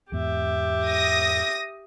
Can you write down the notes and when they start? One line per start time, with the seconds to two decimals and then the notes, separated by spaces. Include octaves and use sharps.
0.12 E2 G#2 B3 G4 E5
0.86 D#6 A#6